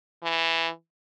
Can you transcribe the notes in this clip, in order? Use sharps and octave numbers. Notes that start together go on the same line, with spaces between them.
E3